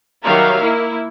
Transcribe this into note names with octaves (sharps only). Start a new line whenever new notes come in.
D#3 F#3 G3 E5 F5 A#5
A#3 E4